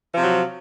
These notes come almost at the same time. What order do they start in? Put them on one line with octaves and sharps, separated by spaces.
F3 C3 F#3